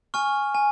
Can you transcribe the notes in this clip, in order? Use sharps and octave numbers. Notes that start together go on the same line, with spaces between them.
G#5 C#6 F6
G#5